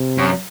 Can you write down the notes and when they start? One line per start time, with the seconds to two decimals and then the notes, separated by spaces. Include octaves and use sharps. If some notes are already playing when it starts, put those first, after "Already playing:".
Already playing: C3
0.18 F#2